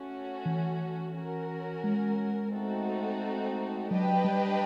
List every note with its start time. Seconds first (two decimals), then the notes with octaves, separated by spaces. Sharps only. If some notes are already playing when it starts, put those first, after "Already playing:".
Already playing: A3 C#4 F#4
0.46 E3
1.14 C#4 F#4 A#4
1.84 G#3
2.52 A3 C4 D#4 F#4 A4
3.90 F#3 D4 G4 B4 D#5 G5
4.25 G3